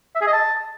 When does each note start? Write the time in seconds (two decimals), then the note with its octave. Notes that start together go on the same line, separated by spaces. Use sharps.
0.15 E5
0.21 G#4
0.27 D#5
0.33 A5